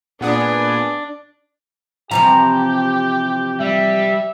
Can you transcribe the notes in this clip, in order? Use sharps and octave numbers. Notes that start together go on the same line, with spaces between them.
A#2 B3 D4 G#4
C3 E3 F3 G4 A#5
G3 E5